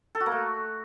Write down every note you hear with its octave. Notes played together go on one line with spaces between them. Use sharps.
A4
F#4
A#3
A3